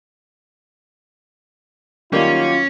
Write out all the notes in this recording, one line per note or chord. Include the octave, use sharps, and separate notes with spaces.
D#3 F#3 G3 A#3 C#4 F4